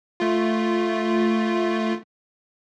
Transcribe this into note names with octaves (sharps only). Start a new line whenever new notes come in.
A3 F4